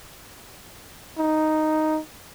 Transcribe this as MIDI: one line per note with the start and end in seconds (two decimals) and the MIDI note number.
1.18 1.99 63